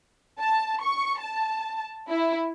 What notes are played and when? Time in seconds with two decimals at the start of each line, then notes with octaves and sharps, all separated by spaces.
0.40 A5
0.83 C#6
1.20 A5
2.09 E4